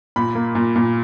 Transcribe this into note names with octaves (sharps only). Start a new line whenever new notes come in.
A#2 B5
A#3
A#2
A#2